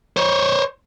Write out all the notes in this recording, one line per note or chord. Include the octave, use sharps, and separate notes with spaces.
C5 C#5